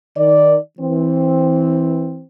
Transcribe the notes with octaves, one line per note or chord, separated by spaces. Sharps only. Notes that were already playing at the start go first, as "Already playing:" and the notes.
D#3 D5
E3 C4